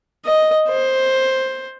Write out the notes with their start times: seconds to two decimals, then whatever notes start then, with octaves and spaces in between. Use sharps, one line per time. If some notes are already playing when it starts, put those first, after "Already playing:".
0.25 D#5
0.69 C5